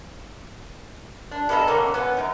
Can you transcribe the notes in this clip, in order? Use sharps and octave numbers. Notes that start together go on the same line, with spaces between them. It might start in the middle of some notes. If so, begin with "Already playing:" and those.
D4
G2 B3 A4 D#5 A#5
B2 D3 A#3 C#4
B3 C#4
F#2 D#4